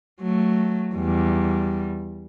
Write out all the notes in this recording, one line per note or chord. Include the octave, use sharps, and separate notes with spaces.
F#3 A3
E2 G3